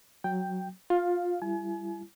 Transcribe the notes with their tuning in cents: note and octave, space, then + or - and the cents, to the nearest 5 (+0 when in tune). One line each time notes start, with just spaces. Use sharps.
F#3 +0 G5 +0
F4 +20 F5 +0
G3 +0 E4 +35 G#5 +35